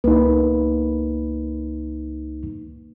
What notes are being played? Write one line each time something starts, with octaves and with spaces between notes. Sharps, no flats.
C#2 A#3 D#4 B4